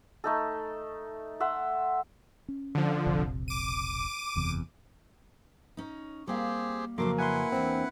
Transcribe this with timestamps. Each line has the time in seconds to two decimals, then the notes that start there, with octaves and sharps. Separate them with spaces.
0.24 A3 D#4 A4
1.40 E5 F#5 C6
2.49 C#4
2.75 D3 F3
3.07 E1 A#1 C3
3.48 D6 D#7
4.36 F#1 E2 C3
5.77 C#4 D#4
6.27 G3 A#3 C4 G4 G#4 F5
6.98 F2 C#3 F#3 A3 A#3 C6 D6
7.18 E4 B4 F#5 G#5 C6
7.52 E2 C4 D4 G#4